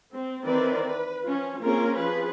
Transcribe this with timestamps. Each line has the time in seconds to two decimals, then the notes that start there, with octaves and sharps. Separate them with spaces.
0.12 C4
0.44 D#3 E3 C4 A#4 B4 D5
0.88 B4
1.25 F3 C#4 F4
1.60 A#3 C4 C#4 F4 G#4 A#4
1.97 F3 G#4 B4